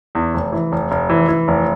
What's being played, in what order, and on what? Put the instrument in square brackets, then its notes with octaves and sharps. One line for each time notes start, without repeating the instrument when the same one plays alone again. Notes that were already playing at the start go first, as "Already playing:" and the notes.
[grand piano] E2
F1
E3
F1
F1
E3
E3
F1